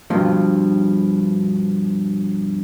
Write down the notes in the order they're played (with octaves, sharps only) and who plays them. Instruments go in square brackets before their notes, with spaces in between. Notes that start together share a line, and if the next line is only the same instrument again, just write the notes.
[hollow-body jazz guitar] G2 B2 F3